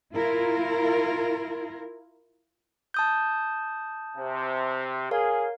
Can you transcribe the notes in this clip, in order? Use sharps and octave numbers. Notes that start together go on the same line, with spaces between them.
E4 F4 A#4
A5 D#6 G6
C3
G#4 A#4 C#5 F5